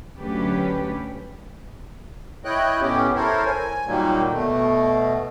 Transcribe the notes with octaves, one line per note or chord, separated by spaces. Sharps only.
D2 F#3 C#4 D4 G4 B4
E4 C#5 D#5 G5 F#6
A2 B3 C#4 G4
E4 A4 A#4 C5 C#5
G#5
A#2 D#3 F#3 G3 A#3
B2 A3